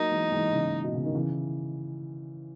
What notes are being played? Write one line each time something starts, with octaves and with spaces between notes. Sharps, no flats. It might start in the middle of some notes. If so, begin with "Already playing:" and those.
Already playing: F#3 A#3 D#4
E3 G#3
E3 G#3
C#3 E3
B2
C#3
D#3
C#3 E3